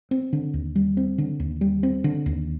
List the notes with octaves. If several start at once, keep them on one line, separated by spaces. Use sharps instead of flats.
C4
D3
D#2
G3
C4
D3
D#2
G3
C4
D3
D#2